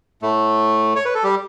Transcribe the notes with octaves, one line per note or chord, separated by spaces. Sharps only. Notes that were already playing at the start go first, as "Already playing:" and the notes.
A2 A3
C#5
B4
A4
G3 G4